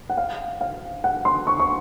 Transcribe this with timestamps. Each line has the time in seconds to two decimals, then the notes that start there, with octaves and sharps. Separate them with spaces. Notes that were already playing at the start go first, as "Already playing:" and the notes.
0.10 F#5
0.17 F5
0.61 F5
1.04 F#5
1.25 C6
1.47 C#6
1.60 C#6